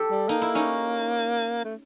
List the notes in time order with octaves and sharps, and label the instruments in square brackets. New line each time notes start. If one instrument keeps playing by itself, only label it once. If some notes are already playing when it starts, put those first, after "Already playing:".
Already playing: [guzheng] G4 A4
[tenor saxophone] G3
[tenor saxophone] A#3 [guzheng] D#4
[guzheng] E4
C#4 D#4
[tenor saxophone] A3